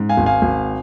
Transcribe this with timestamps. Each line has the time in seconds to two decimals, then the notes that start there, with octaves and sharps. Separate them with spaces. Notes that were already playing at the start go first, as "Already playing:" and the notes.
Already playing: G#2
0.09 F5 G#5
0.17 G#1
0.26 F5 G#5
0.42 G#1